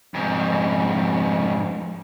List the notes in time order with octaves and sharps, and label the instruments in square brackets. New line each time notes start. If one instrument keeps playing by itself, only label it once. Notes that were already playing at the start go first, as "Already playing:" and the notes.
[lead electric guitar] F2 G#2